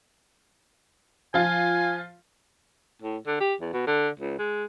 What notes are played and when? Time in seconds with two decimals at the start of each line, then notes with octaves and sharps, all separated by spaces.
1.34 F3 F4 G#5
3.02 A2
3.27 D3
3.40 G4
3.60 E2
3.73 B2
3.87 D3
4.20 C#2
4.38 G#3